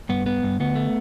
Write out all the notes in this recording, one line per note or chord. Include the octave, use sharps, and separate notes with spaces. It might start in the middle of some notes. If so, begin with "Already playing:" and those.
G2 B3
B3
G2
D2 B3
A3